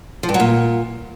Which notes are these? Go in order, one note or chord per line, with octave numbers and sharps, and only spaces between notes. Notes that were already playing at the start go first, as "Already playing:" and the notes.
F3
G2
F#3
A#2